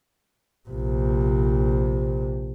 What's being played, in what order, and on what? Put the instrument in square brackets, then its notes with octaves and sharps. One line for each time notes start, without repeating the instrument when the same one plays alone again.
[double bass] A#1 C3